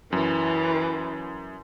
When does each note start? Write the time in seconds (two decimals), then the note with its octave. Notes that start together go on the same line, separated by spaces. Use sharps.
0.12 F#2 E3